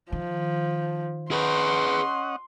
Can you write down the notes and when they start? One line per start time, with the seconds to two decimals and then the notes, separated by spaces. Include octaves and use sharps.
0.12 D#3 F3
1.31 C#4 G#4 B4 D#5 F#5 C6